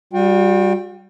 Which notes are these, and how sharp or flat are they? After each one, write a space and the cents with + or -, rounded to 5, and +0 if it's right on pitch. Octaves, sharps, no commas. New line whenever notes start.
G3 +0 F#4 -45 G5 +0